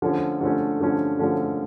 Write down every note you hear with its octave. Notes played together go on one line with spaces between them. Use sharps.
D3 F3 A3 C#4
D3 F3 A3 C#4
D3 F3 A3 C#4
D3 F3 A3 C#4